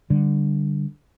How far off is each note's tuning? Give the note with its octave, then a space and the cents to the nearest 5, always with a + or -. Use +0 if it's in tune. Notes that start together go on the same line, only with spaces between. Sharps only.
D3 +0 G3 +0